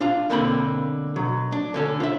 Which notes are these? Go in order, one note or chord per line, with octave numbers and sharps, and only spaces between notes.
D4 F4 F5
B1 D3 A#3 C4 A5 B5
B2 F#3
D4
D3 C#4 A4
F4 E5